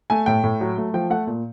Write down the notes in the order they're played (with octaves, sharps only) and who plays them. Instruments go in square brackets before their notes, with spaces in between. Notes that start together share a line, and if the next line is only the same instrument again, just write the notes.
[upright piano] A3 G#5
A2 G5
A2
F#3
A3
F3 G5
A3 F#5
A#2